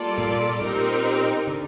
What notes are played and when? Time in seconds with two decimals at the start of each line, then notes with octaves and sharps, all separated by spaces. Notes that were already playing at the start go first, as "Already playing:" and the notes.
Already playing: G3 A#3 F4 A4 D5
0.18 A#2
0.61 A#2 C4 D#4 G4 A#4
1.47 D3